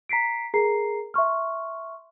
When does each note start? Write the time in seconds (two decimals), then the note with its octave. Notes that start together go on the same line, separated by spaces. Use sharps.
0.09 A#5 B6 C7 D7
0.54 G#4 A#4 A#5 C7
1.14 E5 C6 C#6 F6